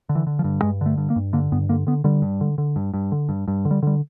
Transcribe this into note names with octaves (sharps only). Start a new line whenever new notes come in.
D3
E3
D3
F3
G2
G2 G#3
D3 A3
G2
A#3
G2
D3 A#3
G2 B3
D3 A#3
D3 B3
D3 G3
G2
D3
D3
G2
G2
D3
G2
G2
D3
G3
D3 G3